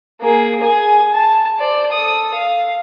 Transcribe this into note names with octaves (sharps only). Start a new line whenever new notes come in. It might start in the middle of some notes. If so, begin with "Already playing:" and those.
A#3 G#4
G#4 G#5
A5
C5 D5
A4 D#6
F5